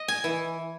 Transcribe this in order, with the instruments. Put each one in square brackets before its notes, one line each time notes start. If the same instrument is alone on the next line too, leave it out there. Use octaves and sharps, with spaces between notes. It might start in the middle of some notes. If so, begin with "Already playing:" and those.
Already playing: [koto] D#5
G#5
E3